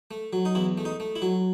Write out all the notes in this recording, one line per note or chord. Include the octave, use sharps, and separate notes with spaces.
A3
F#3
D#4
E2 E4
A3
D#4
A3
E4
F#3